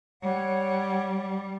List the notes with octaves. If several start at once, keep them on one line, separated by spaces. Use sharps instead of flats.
G3 C#5 F#5